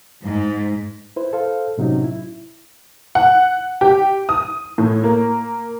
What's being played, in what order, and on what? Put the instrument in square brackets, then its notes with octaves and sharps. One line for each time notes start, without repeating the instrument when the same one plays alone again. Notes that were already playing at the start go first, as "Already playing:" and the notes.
[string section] G#2
[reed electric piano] E4 B4 C5
A4 C5 F5
A2 C3 F#3 C#4 D#4
E4
[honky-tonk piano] F#5
G4
D#6
A2
A#3